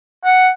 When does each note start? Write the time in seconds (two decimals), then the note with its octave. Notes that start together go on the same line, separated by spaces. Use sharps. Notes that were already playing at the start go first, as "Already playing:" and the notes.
0.25 F#5